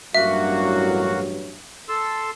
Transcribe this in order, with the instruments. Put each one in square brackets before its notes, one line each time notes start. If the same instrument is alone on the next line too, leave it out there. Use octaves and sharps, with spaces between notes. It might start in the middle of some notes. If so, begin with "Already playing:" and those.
[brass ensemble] A1 G2 F#3 [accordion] A#3 F#4 [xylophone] E5
[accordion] A4 C6 E6